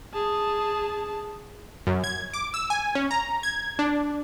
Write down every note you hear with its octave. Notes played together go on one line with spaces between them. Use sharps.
G#4 A5
F#2
G#6
D6
E6
G#5
C#4
A#5
G#6
D4